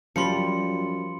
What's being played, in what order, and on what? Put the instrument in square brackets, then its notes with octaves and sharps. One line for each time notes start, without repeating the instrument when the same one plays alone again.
[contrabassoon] F#2 [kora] F3 G3 [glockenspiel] B5 C6 C#7